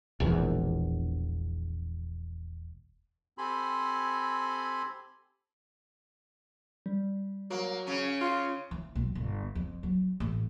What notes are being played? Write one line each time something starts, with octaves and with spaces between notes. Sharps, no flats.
E1 A#1 E2
C4 G4 A4 G#5 B5 C6
G3
F#3 A#3
C#3 C#4
F4 F5
E3
B1
G1
F2
F#3
A1